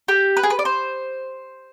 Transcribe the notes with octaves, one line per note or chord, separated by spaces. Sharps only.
G4
B4
G#4
B4
D5
C5